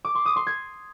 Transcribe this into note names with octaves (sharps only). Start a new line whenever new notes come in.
D6
C6
D#6
C6
G#6